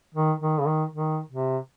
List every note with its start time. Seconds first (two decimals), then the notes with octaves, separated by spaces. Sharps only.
0.15 D#3
0.41 D#3
0.59 C#3
0.66 D#3
0.92 D#3
1.30 C3